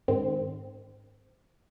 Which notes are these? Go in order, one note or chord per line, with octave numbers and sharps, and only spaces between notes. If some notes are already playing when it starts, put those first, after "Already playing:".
G#2 D#3 C4